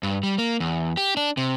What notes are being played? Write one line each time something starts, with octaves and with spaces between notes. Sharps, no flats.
G2
G3
A#3
E2
G4
D4
C3